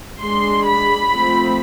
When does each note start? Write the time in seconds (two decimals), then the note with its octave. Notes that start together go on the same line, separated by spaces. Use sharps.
0.21 G#3 D4 C6
0.66 B5
1.11 F3 A3 C4